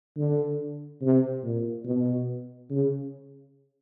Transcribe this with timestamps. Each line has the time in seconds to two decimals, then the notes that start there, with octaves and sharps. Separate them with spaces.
0.17 D3
1.02 C3
1.44 A#2
1.85 B2
2.70 C#3